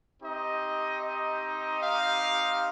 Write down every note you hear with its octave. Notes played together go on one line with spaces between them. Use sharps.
C4 D#4 G4 D#5
D#5
F5